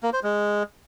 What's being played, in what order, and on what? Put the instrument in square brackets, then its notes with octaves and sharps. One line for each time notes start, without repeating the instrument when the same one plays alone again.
[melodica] A#3
C5
G#3